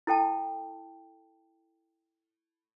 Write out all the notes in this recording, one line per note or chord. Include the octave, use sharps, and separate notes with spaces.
E4 A4 G5 A5